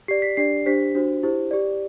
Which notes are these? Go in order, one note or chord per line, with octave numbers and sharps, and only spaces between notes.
G4 D5 C7
B6
D4 G4 D5 C7
D4 G4 C5 B6
D4 F#4 C5
E4 G4 C5
G4 D5